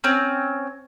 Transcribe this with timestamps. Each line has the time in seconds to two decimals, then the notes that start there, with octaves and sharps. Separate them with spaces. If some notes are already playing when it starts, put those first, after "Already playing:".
0.04 C4 C#4